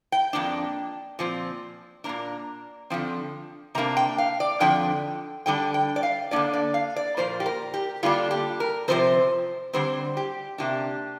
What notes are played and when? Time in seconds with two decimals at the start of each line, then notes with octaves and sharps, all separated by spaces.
0.12 G5
0.33 F2 D3 A#3 D4
1.19 A#2 F3 C4
2.04 A#2 A#3 D4 A#5
2.90 D3 F3 C4
3.75 C3 A#3 D4 A#5
3.97 G5
4.18 F5
4.40 D5
4.60 F2 D3 F3 D4 G5
5.46 D3 G3 D4 G5
5.74 G5
5.96 D5
6.03 F5
6.31 D3 A#3 D4 D5
6.53 D5
6.74 F5
6.96 D5
7.17 A#2 F3 A#3 C5
7.40 G4
7.46 A#4
7.74 G4
8.03 D3 G3 A#3 D4 F4
8.31 G4
8.60 A#4
8.88 C3 F3 C4 C5
9.73 D3 G3 C4 C5
10.17 G4
10.58 C3 A#3 D4 G4